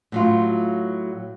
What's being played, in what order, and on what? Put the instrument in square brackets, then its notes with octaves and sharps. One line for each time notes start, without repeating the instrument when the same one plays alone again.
[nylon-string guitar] A2 F#3 F4